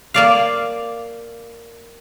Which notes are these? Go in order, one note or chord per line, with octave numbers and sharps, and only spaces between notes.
A#3 D5 F5